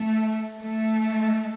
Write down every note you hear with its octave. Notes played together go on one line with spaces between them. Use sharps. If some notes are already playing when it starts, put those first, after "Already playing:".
Already playing: A3
A3